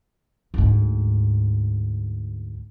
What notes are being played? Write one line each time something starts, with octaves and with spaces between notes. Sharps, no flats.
D2 G#2